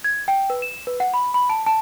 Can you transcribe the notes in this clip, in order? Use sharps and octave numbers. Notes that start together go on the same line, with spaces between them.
G#6
G5
B4
E7
B4
F#5
B5
B5
A5
A5